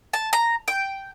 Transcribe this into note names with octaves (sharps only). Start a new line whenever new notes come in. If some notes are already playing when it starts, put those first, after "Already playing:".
A5
A#5
G5